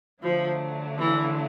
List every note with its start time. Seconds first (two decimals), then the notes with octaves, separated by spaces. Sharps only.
0.23 D3 F3 F#3 A3 D4
0.98 E3